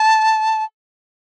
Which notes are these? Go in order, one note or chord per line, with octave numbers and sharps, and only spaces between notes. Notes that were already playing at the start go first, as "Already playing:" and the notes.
Already playing: A5